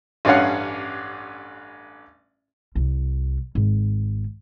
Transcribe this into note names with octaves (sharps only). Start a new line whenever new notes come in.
A1 G2 C#4 F5 F#5
C2
G#1